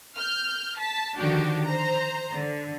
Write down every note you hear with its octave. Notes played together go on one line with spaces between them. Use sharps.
F6 G6
A5 B6
D3 D#3 F3 D4 F#4 G4
C5 A#5
D3